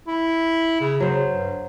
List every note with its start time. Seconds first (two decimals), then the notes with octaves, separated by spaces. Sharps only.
0.08 E4
0.80 C#3
1.00 C#3 F#3 C5
1.29 G2